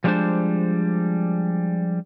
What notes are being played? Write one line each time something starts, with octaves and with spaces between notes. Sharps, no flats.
F3 G3 G#3 A#3 D4 C5